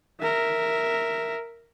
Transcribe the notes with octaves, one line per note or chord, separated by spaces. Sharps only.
A#4 E5